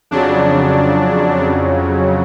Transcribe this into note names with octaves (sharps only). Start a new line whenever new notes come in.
F2 C#3 F#3 D4